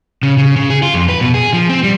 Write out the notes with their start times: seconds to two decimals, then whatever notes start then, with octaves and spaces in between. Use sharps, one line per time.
0.23 C#3
0.38 C#3
0.56 C#3
0.70 G#4
0.82 F4
0.94 F2
1.09 B4
1.21 B2
1.34 G#4
1.54 F3
1.69 C4
1.84 G3